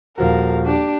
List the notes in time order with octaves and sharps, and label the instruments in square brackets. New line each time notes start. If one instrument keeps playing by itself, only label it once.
[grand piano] D#1 F3 F#4 [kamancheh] A#4 F5
[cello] D4 [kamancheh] G4